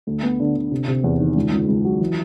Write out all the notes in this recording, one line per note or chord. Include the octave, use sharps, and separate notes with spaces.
D2
B3
D3
D3
C3
C3
E2
D#3
C#2
C#2
C#2
F#3
E3